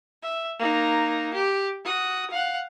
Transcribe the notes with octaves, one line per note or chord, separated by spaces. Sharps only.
E5
A#3 D#4
G4
F#4 D#6
F5 F#5